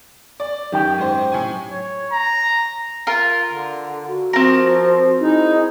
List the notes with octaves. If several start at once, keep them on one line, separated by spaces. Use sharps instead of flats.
D5
F#2 D#3 G4 G5
G#2 C5
A2 G#5
C#5
A#5
F4 A#4
D3
F#4
F3 C4 A#4
D#4 E4 G#4